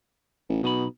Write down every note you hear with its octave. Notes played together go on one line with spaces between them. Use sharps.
A1
B1 B2 D#4 B5